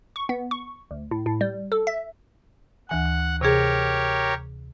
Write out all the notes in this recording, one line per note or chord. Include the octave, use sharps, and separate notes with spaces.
C#6
B3
C#6
D2
A2
A2
G3
A4
E5
D2 E3 F#5 G#5
C3 G4 G#4 A#4 C#5